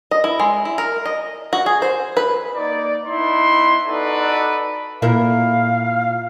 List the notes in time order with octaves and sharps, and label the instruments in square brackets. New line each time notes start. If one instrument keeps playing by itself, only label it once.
[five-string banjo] D#5
E4
G#3
E4
A#4
D#5
F#4
G#4
C5
B4
[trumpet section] A#3 D#4 D5
B3 D#4 E4 C6
D#4 F#4 A4 B4 D5
[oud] A#2 E4 A#4 [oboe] F5